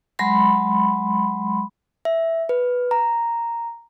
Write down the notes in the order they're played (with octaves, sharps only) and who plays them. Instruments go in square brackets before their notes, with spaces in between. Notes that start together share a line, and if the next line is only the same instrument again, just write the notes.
[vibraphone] F#3 G#3 B5 C6
[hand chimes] E5
B4
A#5